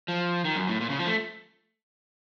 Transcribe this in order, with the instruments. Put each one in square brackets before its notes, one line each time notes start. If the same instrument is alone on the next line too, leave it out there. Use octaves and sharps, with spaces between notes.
[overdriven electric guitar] F3
D#3
F#2
A2
A#2
C#3
F3
A3